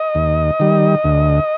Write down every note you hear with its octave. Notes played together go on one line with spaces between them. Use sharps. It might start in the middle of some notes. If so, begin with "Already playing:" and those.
Already playing: D#5
D#2
D#3 G3
D2